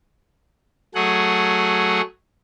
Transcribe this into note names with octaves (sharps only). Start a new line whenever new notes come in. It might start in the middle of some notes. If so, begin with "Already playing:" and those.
F#3 A3 G#4 F#5